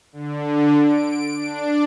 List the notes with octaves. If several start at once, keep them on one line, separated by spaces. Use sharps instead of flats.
D3
D7
D4